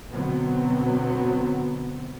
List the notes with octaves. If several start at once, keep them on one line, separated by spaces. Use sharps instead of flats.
B2 D3 F#3 B3 C4